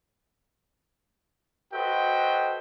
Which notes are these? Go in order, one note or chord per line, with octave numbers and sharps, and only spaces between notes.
F#4 A4 B4 C5 D#5 G5